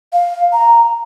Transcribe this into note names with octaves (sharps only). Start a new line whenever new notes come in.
F5
A#5